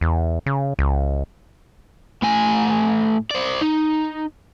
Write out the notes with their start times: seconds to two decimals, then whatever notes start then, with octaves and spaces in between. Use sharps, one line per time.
0.01 E2
0.46 C#3
0.79 C#2
2.22 A2 G#5
3.31 C5 D5
3.62 D#4